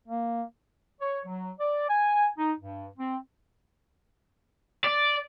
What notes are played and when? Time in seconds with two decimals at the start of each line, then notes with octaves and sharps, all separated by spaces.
0.08 A#3
1.01 C#5
1.26 F#3
1.60 D5
1.89 G#5
2.38 D#4
2.60 G2
2.98 C4
4.84 D5